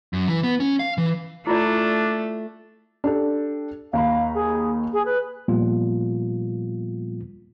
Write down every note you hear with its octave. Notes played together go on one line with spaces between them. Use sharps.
F#2
E3
B3
C#4
F5
E3
A3 D4 E4 F4 D5
D4 G4 A4
D#2 F5 A#5 B5
G#4
G#4
B4
A#2 F3 G3 A#3 B3 F4